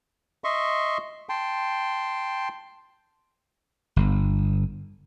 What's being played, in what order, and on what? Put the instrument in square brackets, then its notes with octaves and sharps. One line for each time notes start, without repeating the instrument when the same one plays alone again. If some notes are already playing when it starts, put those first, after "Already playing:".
[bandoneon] D#5 E5 C6 C#6
G5 A5 C6
[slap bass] G1